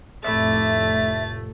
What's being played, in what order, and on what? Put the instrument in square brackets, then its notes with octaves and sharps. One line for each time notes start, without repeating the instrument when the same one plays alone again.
[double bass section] F1 A2 [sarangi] A3 [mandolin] E4 D5 E5 [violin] A6